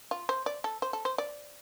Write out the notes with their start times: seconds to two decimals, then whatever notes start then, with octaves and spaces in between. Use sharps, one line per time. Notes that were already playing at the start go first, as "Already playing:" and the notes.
0.11 F4
0.29 C5
0.46 D5
0.64 A4
0.82 C5
0.93 A4
1.05 C5
1.18 D5